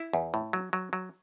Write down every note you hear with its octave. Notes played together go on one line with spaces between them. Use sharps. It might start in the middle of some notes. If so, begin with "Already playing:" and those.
Already playing: E4
E2
A2
F#3
F#3
F#3